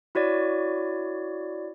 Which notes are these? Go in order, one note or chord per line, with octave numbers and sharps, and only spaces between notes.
E4 F#4 C#5 D5